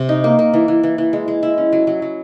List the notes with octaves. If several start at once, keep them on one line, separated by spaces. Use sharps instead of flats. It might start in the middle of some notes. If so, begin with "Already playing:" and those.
Already playing: C3
D#4
A#3
A#3
E3
E3
E3
E3
G#3
G#3
E4
C#4
F#3
F#3
F#3